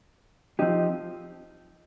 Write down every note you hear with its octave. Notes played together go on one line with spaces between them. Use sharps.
F3 C4 D#4 G4